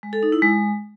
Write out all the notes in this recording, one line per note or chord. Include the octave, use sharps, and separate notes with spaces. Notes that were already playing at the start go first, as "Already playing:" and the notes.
G#3
A4
D#4
E4
G#3